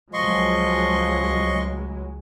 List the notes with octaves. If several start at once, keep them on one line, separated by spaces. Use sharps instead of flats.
C#2 F3 F#3 G#3 D#5 C6 C#6